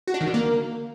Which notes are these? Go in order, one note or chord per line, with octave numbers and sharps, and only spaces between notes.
F#4
D4
D#3
D3
A#3